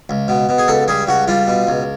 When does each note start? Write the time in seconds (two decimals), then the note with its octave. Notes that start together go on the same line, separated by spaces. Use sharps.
0.09 C#2
0.28 B2
0.49 B2
0.58 G#4
0.68 C#2 A4
0.88 G3 G#4
1.07 C#2 F#4
1.28 G3 F4
1.47 B2
1.67 C#2